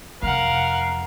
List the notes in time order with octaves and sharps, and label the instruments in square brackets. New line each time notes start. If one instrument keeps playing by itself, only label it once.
[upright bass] F2 C3 [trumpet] A#4 [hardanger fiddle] F5 F#5